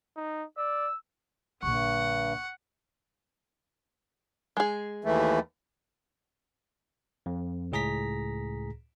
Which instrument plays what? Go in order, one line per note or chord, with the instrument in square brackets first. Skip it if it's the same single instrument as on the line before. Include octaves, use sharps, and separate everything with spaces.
[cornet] D#4
[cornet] D5 [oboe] E6
[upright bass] A#1 D3 [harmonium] G2 [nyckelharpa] F#5 [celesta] C#6
[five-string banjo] G#3 G#4
[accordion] D#2 E3 A3
[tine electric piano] F2
C#2 A2 G#4 A#5 A#6 B6